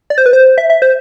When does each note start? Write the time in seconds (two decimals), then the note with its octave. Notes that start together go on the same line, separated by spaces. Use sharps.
0.10 D5
0.18 C5
0.26 B4
0.33 C5
0.58 E5
0.70 E5
0.82 C5